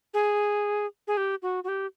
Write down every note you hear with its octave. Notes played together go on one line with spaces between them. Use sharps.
G#4
G#4
G4
F#4
F#4
G4